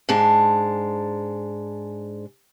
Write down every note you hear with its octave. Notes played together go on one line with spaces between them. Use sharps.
G#2 G#3 D4 A5